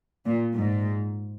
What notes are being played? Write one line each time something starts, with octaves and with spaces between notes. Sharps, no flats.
A#2
G#2